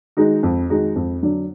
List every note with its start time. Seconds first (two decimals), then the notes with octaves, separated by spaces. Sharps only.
0.17 D#3 G#3 D#4 F#4
0.43 F2
0.70 D#3 G#3 D#4 F#4
0.96 F2
1.22 D3 F#3 D4